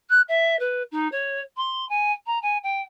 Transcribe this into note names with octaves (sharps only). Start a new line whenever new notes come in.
F#6
E5
B4
D#4
C#5
C6
G#5
A#5
G#5
G5